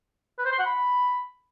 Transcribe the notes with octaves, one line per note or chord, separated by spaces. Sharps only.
B4
C5
C6
F#5
B5